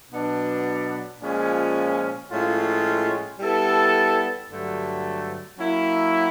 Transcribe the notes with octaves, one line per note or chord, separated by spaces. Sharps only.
B2 F#3 B3 D4
A#2 F3 G#3 C#4
A2 F3 G#3 C#4 F4
G3 B3 E4 A4
G2 D3 F#3 A3
F#3 A#3 C#4 E4